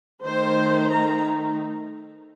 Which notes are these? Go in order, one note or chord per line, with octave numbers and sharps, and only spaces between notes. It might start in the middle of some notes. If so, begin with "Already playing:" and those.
D#3 A3 D#4 C5
A#5